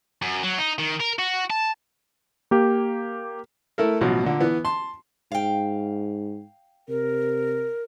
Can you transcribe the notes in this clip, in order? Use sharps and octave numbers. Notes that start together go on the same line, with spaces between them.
F#2
F#3
D#4
D#3
A#4
F#4
A5
A#3 G4
A3 E4 A4 A#4
A1 B2 F3 F#3
A#2 D3
E3 B3
A5 C6
G#2 F5 G5
C3 A#4